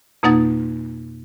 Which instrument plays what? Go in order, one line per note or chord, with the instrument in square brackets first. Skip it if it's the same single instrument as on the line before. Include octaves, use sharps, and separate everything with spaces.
[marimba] F2 B2 A#3 D#4 F#5 A6